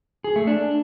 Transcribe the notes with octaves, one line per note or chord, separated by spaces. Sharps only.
G#4
A3
D4